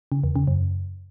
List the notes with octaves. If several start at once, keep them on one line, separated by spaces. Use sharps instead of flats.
C#3
E2
C#3
F#2